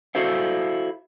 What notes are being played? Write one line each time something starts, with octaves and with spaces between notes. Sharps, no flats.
E4 F#4 A4 C5 F5